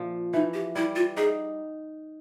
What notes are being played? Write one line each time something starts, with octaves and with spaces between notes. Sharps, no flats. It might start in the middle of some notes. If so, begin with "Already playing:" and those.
Already playing: A#2 F3
E3 D#4
G4
G3 E4
F4
D#4 G#4